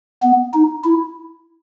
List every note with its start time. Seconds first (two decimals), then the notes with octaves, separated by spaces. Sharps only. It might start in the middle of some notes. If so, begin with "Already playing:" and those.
0.22 B3
0.54 D#4
0.84 E4